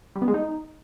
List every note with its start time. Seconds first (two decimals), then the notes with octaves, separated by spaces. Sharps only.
0.16 G3
0.22 B3
0.28 G#3
0.34 D#4